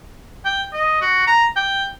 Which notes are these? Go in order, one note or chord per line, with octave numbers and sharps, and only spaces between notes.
G5
D#5
F#4
A#5
G5